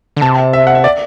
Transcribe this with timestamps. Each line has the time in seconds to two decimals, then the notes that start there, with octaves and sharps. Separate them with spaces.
0.17 D3
0.21 C3 A5
0.53 E5
0.67 F#5
0.75 E5
0.84 D5